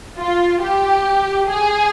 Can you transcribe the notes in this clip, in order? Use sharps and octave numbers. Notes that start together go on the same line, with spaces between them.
F4
G4
G#4